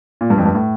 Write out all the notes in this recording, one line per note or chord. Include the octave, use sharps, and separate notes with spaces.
A#2
G2
F2
G2
A2